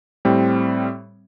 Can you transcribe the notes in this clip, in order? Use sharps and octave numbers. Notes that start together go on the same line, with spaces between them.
A2 G3 C4